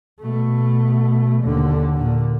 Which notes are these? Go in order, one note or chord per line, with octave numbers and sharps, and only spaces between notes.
B2 A3
D#2 D3
A#2 D3